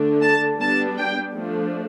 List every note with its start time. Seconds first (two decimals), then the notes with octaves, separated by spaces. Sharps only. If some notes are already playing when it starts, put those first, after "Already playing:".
Already playing: D3 A3 D4
0.22 A5
0.60 G3 B3 D4 A5
0.98 G5
1.34 F3 A3 D4